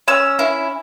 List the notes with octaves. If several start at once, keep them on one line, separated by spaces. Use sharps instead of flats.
C#4 E6
E4